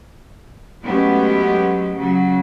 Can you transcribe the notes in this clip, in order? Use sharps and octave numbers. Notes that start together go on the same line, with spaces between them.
F#3 G#3 A3 B3 C#4 G4
C#3 F#3